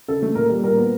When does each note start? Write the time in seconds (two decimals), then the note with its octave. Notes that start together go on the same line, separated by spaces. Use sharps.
0.08 C#3 A4
0.22 A3
0.35 A#2 A#4
0.49 G3
0.64 A#2 A#4
0.78 B3